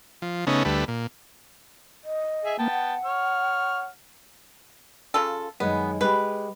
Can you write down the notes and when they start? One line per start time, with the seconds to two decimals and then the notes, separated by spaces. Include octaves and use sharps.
0.22 F3
0.47 C#3 A3 B3 C#4 D#4
0.65 D2 G3 A3 B4
0.88 A#2
2.04 D#5
2.44 G#4 E5 G#5
2.59 A#3 B3 G5 A5
2.71 F#5
3.05 C#5 F6
5.14 C#3 F4 A4
5.60 F#2 D#3 G#3 B3
6.01 G#3 G4 B4